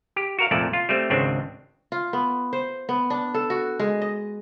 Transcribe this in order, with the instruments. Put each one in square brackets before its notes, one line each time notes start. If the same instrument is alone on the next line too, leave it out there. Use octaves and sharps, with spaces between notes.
[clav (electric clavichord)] G4
F#4 A#4 F5
C2 F2 A#2 A3 D5 A5
F4
G3 A3 C4
G#1 C#2 C#3 C4 D4
[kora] F4
B3
C5
B3
D4
A4
F#4
G#3
D#5